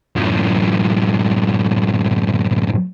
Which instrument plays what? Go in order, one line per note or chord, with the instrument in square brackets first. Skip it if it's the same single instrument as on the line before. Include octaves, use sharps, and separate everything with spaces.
[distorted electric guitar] F#2 A2